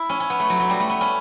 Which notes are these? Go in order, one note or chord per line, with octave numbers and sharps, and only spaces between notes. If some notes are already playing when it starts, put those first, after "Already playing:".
Already playing: E4
C#4
C#4
B3
A3
F#3
F#3
G3
A3
B3
C#4